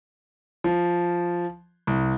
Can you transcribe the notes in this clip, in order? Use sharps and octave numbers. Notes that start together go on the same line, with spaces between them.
F3
C2